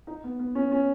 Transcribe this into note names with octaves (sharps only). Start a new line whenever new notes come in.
D#4
B3
B3
C#4
C#4